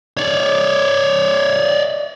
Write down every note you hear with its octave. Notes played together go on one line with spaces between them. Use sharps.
C#5 D5